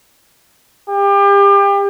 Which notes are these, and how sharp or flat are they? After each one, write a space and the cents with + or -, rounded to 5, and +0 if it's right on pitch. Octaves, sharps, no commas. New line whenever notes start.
G4 +30